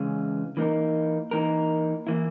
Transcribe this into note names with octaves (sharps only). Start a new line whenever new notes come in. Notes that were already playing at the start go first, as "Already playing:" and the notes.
Already playing: C#3 E3 G#3 C#4
E3 A#3 D#4 A#4
E3 A#3 D#4 A#4
E3 A#3 E4